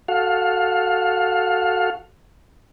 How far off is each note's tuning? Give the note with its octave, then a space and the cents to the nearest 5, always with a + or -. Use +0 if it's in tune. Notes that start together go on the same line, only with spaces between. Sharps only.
F#4 +0 A4 +0 F5 +20